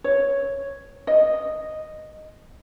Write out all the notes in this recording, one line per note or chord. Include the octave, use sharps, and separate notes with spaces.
C#5
D#5